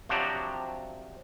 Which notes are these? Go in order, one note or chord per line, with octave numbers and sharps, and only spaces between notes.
C3 F3 F#3 D4 F#4 G4